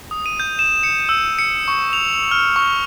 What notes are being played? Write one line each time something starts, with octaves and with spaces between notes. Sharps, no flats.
D#6
D#7
G6
E7
C#7
E6
C#7
C#6
F7
F6
C#6